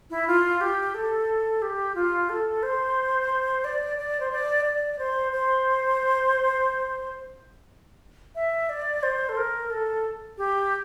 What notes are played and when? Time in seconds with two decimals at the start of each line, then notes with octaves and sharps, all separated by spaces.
0.10 E4
0.27 F4
0.61 G4
0.94 A4
1.62 G4
1.95 F4
2.29 A4
2.63 C5
3.64 D5
3.98 D5
4.20 C5
4.31 D5
4.65 D5
4.99 C5
5.32 C5
8.35 E5
8.69 D5
9.03 C5
9.29 A4
9.37 A#4
9.70 A4
10.38 G4